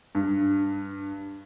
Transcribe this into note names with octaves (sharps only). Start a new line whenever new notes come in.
G2